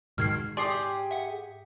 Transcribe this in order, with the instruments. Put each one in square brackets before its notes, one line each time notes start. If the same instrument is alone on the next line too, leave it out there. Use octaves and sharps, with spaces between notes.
[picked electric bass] G#2 [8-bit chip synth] B2 D#3 [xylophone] F6 G#6 C7
[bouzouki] G4 G#4 [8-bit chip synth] D5 D#6 [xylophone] C6 D6 C7
[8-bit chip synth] E5 F#5